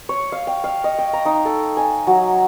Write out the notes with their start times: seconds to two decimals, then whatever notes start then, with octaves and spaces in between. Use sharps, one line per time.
0.09 C#5
0.32 F5
0.47 G5
0.64 F5
0.84 D#5
0.98 G5
1.13 A#5
1.26 D#4
1.45 A4
1.77 G#5
2.07 F#3